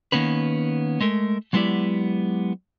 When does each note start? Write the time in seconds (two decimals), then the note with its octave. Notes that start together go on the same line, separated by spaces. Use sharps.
0.12 D#3 A#3 B3 C#4 B4
1.01 G#3 A3 A#4
1.53 F#3 G#3 B3 E4 G4 D5